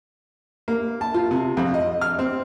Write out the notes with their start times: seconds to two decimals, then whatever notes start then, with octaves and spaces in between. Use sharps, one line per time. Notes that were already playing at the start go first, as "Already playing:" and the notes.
0.68 A#3
1.01 A5
1.14 F4
1.31 C3
1.57 F2
1.74 D#5
2.01 F6
2.19 C4